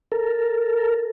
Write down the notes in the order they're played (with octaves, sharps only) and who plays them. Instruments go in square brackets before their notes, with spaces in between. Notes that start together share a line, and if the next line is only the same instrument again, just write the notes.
[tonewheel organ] A4 A#4